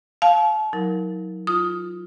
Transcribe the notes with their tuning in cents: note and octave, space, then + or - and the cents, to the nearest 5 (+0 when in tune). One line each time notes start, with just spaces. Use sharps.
F5 +0 A5 -35
F#3 -15 D#4 +45 A#4 +0
F4 +0 D#6 +5